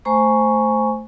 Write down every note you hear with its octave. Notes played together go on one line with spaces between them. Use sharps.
A3 C5 G#5 A#5 C#6